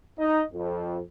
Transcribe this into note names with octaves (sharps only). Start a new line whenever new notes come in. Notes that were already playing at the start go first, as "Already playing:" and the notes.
D#4 D#5
F2